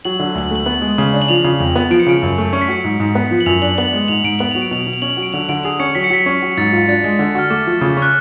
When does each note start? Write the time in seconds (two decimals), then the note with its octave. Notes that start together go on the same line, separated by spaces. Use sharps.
0.05 F#3 F#7
0.19 D3 F#7
0.35 D2 F#7
0.51 A3 F#7
0.66 B3 F#7
0.82 G#3
0.98 C#3
1.14 D4
1.22 F#7
1.29 F3 F7
1.44 C#3
1.60 F2
1.76 B3
1.90 F3 D7
1.99 C#7
2.06 C#3 D7
2.22 F#2
2.38 A3
2.53 C#4 C#7
2.61 B6
2.68 F#3 C#7
2.84 G#2
3.00 G#2
3.15 B3
3.31 F3
3.40 F#7
3.46 F#2 F7
3.62 D4 F#7
3.78 B3 F#7
3.93 G#3
4.08 G#2 F7
4.24 G#2 D7
4.39 B3 F#7
4.51 F#3 F7
4.62 D7
4.71 B2 F7
4.87 B2
4.93 F7
5.02 C#4 F#7
5.17 F#3
5.23 D7
5.33 D3 F7
5.49 D3 D7
5.63 G#4 F7
5.79 C#4 C#7
5.95 F#3 B6
6.04 C#7
6.10 F#3 B6
6.26 C#4
6.42 F#3
6.57 G#2 A6
6.73 F4
6.88 D4 A6
7.04 G#3
7.19 D3
7.35 F#4 F6
7.50 A3 D6
7.67 F3
7.81 C#3
7.97 C#4
8.02 F#6